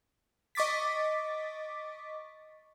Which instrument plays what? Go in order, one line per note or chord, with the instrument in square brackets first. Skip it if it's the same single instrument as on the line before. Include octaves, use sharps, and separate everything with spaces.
[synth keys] D#5 C#6 D6 A6 B6